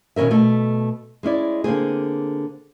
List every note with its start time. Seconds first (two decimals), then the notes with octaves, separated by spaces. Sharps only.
0.16 B2 D#3 C#4 A#4 E5
0.31 B2 A3 A4
1.23 G#3 C#4 E4 D5
1.64 D3 A#3 C4 G#4